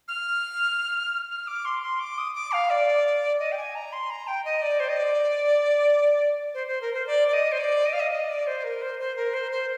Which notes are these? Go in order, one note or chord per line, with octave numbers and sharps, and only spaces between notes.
F6
F6
D6
C6
C6
D6
D#6
D6
F5
D5
D#5
G5
G#5
A#5
C6
A#5
G5
D#5
D5
C5
D#5
D5
C5
C5
A#4
C5
D5
D5
D#5
C5
D5
D#5
F5
D#5
D#5
D5
C5
A#4
C5
C5
A#4
C5
C5